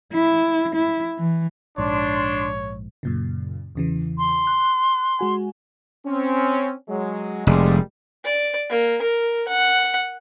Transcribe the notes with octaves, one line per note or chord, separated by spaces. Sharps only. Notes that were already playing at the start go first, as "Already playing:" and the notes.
E4
E4
E3
A#1 G#2 D4 C#5 C6
F#2 A#2 C#3
E2 C#3 E3
C6
F#6
G#3 F#4 G#5
C4 C#4
F#3 G#3
F1 A#2 G3 G#3
D5
A#3
A#4
F#5